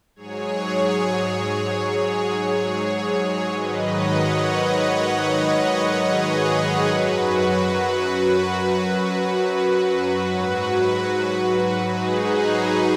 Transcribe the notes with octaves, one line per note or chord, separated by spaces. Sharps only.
G#2 F#3 G#4 C#5
G#2 D#3 F#3 B4 D#5
C#5 F#5
B4 D#5
C#5 F#5
B4 D#5
G#4 C#5
F#2 F#3 F#4 B4
F#4 B4
G#2 F#3 F#4 B4
D#4 G#4